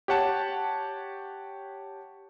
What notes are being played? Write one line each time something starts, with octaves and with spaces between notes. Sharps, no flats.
G4 C#5 F#5 A5